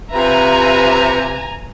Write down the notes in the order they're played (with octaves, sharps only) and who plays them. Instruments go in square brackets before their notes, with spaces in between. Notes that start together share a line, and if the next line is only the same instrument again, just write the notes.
[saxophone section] C3 [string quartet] F4 B4 E5 [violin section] G#5 A#5